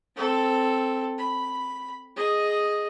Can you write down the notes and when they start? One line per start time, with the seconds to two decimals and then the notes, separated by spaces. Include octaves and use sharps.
0.16 C4 A4
1.18 B5
2.16 G#4 D#5